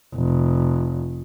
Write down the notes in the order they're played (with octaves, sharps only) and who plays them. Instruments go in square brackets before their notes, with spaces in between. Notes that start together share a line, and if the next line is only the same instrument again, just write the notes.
[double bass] F1